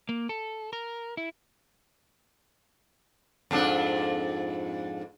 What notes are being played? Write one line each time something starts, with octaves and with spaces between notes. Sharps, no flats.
A#3
A4
A#4
E4
F2 G#2 D4